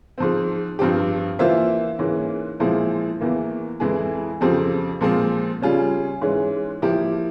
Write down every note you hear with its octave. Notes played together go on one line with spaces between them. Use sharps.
G#2 F3 C4
G2 F3 C4 G4
E3 A#3 F4 C5 E5
G#2 E3 A#3 C#4
A#2 F3 G#3 C4 E4
E2 E3 A#3
F2 E3 G#3 E4 G#4
F2 C#3 F3 C4 G4
A#2 F3 G#3 C4
C#3 G3 C#4 F4 G#4
G#2 E3 G#3 C#4
F3 A#3 E4 G4